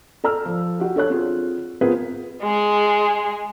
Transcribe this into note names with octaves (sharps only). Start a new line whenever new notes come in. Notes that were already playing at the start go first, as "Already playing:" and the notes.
A4 D5 A#5 E6 F6
F3
F#4 G4
D4 A4 C#5 F#6
C4 F4 G#4
B3 C4 F4 G#4 A#4 B4
G#3 G#4